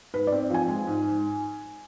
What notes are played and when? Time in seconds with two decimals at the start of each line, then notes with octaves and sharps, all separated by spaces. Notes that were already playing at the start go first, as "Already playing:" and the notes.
0.14 G#2 B4
0.27 D5
0.32 C4
0.50 F3 G#5
0.68 G#3
0.87 G#2